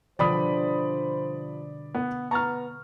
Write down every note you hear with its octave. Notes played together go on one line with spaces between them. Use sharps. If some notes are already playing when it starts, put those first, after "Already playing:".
B2 D3 F3 G3 C5 D5 B5 D#6
B3
B3 A#5 C#6 F6 A6